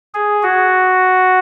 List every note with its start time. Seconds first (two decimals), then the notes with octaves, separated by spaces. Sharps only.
0.14 G#4
0.43 F#4